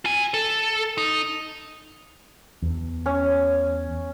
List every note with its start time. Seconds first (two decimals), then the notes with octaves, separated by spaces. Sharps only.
0.05 F4 G#5
0.34 A4
0.98 D#4
2.62 E2
3.06 C#4